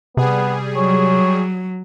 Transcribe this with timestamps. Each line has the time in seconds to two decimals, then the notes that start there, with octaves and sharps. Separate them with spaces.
0.17 C3 G3 B3 G#4
0.75 F#3 C#5